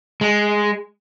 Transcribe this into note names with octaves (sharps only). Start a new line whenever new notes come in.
G#3